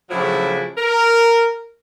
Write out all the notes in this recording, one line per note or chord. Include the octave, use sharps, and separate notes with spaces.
A2 C#3 F3 F#3 D4 E4
A#4